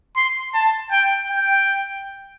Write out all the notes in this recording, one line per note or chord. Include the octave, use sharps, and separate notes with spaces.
C6
A5
G5
G5